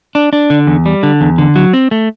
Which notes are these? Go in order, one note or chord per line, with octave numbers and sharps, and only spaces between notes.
D4
D4
D3
E2
G3
D3
E2
D3
F#3
C4
A3